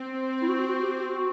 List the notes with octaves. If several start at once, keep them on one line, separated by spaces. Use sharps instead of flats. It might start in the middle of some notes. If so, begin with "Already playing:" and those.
Already playing: C4
E4
F#4
F#4
G4
F#4
F#4